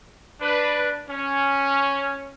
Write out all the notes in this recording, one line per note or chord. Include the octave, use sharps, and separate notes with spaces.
D4 B4
C#4